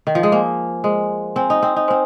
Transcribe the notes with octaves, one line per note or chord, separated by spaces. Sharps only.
D#3
F3
G#3
A#3 C5 G#5 C6
G#3 C5 G#5 C6
C4 C5 G#5 C6
D#4
C4
D#4
C4 C5 G#5 C6